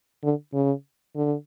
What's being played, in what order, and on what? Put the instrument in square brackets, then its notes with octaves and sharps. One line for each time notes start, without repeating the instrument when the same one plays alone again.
[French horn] D3
C#3
D3